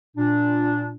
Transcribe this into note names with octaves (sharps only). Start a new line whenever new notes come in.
A#2 D4